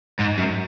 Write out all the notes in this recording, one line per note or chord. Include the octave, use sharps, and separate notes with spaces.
G#2
F#2